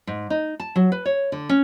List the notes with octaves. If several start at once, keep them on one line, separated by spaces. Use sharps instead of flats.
G#2
D#4
A5
F#3
B4
C#5
D3
C#4